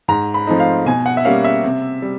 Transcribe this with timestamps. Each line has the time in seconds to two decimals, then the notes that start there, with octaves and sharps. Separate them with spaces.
0.08 G#2 A#5
0.34 B5
0.47 F3 A3 C4 D#4
0.60 F5
0.86 B2 G#5
1.06 F#5
1.17 E5
1.25 G3 A#3 C#4 F5
1.44 E5
1.64 C3
2.02 G3